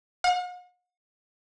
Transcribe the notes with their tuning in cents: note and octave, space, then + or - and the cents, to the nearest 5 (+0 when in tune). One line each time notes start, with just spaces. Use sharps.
F#5 -45